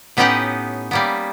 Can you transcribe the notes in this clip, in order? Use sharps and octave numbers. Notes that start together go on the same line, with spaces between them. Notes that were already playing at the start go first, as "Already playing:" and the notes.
A2 B3 C#4 D#4 G4 F#5
G3 A#3 B3